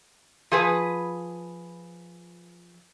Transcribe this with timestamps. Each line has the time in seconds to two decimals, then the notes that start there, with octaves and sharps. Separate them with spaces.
0.52 F3 G#4 B4